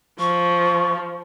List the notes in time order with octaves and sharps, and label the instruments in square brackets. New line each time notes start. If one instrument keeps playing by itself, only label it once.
[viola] F3 [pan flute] C#6